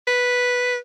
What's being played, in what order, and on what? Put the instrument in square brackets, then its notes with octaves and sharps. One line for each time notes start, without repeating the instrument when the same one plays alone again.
[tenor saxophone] B4